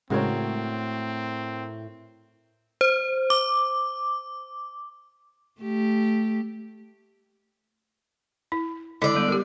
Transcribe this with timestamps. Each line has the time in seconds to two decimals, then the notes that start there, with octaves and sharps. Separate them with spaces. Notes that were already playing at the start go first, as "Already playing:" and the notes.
0.10 A2 C#3 G#3 C4 F#4 A#4 C#5
2.81 C5
3.30 D6
5.61 A3 G4
8.52 E4
9.02 D3 G#3 E4 D5
9.15 G3 B3
9.28 G4 A#4